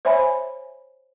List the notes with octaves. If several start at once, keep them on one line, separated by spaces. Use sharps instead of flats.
C5 C#5 E5 G#5 B5